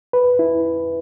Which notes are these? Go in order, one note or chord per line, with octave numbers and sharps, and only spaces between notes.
B4
E4